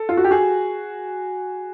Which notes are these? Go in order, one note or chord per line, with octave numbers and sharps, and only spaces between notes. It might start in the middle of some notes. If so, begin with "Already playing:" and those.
Already playing: A4
F4
F#4
G4
F#4 G#4